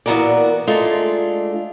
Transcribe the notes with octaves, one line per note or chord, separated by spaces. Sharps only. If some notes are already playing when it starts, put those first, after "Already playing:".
A#2 E3 B3 F#4 A#4 D5
G#3 A3 D4 F4